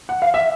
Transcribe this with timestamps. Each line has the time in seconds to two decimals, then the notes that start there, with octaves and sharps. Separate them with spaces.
0.09 F#5
0.22 F5
0.34 E5